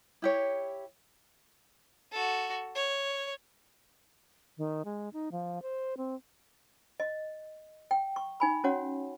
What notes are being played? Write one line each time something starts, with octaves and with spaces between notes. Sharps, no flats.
E4 G4 C#5
F#4 A4
C#5
D#3
G#3
D#4
F3
C5
C4
D#5
G5
C#6
D#4 G#5 B5
C#4 F#4 C#5 F#5